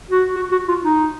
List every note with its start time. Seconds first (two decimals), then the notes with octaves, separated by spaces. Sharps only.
0.11 F#4
0.36 F#4
0.52 F#4
0.68 F4
0.85 D#4